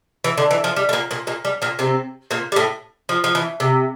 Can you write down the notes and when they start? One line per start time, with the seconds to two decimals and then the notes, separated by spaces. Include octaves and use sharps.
0.24 E3
0.38 D3
0.51 E3
0.64 F3
0.76 G3
0.89 A3
0.93 A#2 A#3
1.11 A#2 A#3
1.27 A#2 A#3
1.45 G3
1.62 A#2 A#3
1.79 C3 C4
2.31 A#2 A#3
2.52 G3
2.56 A2 A3
3.09 F3
3.24 F3
3.35 E3
3.60 C3